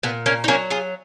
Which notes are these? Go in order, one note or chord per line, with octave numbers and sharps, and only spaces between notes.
A#2 B3
A#3 C#4
D#4
F#3 A#3 C#4
F4 G#4